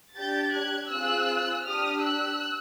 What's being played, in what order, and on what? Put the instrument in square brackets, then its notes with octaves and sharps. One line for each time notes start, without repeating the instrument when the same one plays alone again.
[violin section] D4 G4 G6 A6
F#6 G#6
C4 F4 G#4 E6 F#6
D4 G4 D#6 F6
E6 F#6